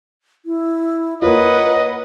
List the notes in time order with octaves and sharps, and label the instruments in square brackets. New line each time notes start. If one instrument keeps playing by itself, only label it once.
[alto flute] E4
[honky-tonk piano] A#3 F4 [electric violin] B4 F#5 [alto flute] C#5 [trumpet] D#5